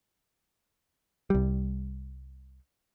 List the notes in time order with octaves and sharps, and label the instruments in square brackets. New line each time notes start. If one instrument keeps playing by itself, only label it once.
[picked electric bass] C2 G3